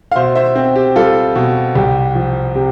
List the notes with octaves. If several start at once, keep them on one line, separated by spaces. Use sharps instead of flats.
F5
B2 C5 E5
C5 E5
C4
G4
G3 F4 A4
B2
C2 G4
F3
C3 G4